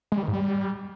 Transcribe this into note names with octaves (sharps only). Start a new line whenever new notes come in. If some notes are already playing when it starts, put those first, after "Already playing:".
G#3
G3
D#3
G#2
G3